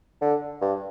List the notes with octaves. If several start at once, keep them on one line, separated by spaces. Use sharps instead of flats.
D3
G2